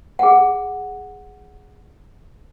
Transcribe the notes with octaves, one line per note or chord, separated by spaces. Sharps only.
G#4 F#5